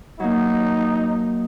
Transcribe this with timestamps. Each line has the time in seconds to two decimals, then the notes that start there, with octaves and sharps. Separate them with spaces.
0.20 F#3 A#3 D#4